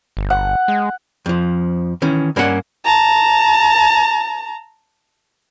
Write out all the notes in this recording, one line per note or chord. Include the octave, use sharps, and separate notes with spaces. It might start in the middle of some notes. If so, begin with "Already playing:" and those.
G1
F#5
G#3
F2 F3
D#3 E3 C#4
G2 A#3 C#4 G#4 F#5
A5 A#5